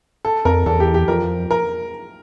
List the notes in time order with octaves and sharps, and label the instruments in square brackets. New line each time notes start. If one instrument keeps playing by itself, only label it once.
[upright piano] A4
[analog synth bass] F2 [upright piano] A#4
[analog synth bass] E2 [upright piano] A4
[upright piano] G4
G4
[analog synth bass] F2 [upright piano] A#4
[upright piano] A#4